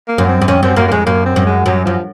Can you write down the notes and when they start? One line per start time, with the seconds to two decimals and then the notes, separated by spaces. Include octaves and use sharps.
0.08 A#3
0.18 F#2
0.28 C4
0.42 F#2
0.48 F2 C#4
0.62 F#2 C4
0.77 F#2 A#3
0.88 A#3
0.92 F2 G#3
1.06 F#2 A#3
1.26 C4
1.36 F#2
1.47 G#3
1.66 F#2 F#3
1.85 F#2 F3